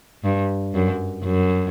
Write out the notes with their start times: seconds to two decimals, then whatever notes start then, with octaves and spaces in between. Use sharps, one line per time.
0.24 G2
0.74 F#2
1.24 F#2